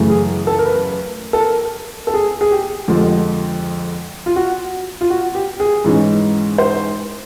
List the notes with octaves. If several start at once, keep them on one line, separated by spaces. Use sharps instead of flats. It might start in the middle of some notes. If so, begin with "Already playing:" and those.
Already playing: F#2 C#3 E3 A3
G#4
A4
A#4
B4
A4
A#4
A4
G#4
G#4
G4
F2 D3 F3 G#3
F4
F#4
F4
F#4
G4
G#4
G#2 E3 G#3 C#4
C5